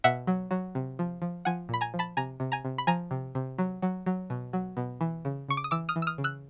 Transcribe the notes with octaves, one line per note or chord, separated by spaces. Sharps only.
B2 E5 F#5
F#3
F#3
C3
F3
F3
F3 F#5 G#5
A#2 B5
G#5 A#5
F3
A5 B5
C3 G#5 A#5
C3
G#5 A#5
C3
B5
F3 G#5 A#5
C3
C3
F#3
F#3
F#3
B2
F#3
B2
E3
C#3
C#3 C#6
D6
D#6
E3 D6 E6
D#6 F6
E3
E6
D#6 F6
C#3
E6 F#6